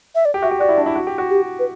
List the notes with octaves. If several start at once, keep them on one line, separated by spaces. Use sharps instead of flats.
E5
D5
G4
F#4 E5
G4
F#4 D5
E4
D4
E4
F#4
G4
F#4
G4
B4